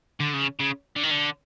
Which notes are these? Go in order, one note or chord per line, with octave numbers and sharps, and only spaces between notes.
D3
C#3
C#3
D3
D#3
D3